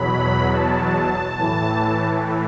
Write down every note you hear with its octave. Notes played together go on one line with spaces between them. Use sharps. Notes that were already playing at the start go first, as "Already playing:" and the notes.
Already playing: E2 B2 F#3 B5
A5
A2 E3